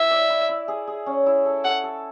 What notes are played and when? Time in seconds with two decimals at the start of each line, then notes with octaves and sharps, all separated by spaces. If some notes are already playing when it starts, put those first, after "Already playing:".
Already playing: E4 E5
0.11 D5
0.30 E4
0.49 E4
0.68 G#4
0.87 G#4
1.06 C#4
1.26 E4
1.46 A4
1.65 A4 F#5
1.84 A4